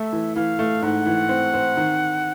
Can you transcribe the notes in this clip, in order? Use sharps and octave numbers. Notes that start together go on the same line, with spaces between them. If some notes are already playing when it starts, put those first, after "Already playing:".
Already playing: A3 E5
E3
E3 F5
A3
G#2 F#5
E3
C4
C4
D#3